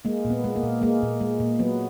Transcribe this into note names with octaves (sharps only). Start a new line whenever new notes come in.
G#3 A#3
A#2
B3
G#3
A#3
A#2
G#3 A#3
A#2
G#3
A#2
F#3 B3